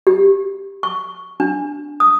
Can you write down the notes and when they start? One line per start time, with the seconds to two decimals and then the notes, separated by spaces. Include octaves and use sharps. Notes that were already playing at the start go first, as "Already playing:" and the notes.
0.07 G4
0.83 C#6
1.40 D4
2.00 D#6